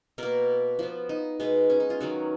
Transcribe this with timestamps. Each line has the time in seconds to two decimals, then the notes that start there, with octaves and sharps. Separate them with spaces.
0.18 B2 A#3 A#4
0.79 F3 B3
1.09 D#4
1.40 B2 G#3 B3
1.70 C#4
1.80 D#4
1.90 F4
2.00 D#3 F#3 B3 F#4